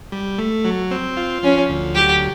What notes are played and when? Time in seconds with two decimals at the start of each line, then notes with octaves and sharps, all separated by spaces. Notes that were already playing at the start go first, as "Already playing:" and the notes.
0.12 G3
0.38 A3
0.65 F#3
0.91 C4
1.17 F4
1.43 F3 C#4
1.69 D2
1.96 F#3 G4